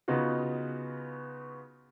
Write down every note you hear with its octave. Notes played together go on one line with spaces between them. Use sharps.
C#3 B3 D#4 F4 F#4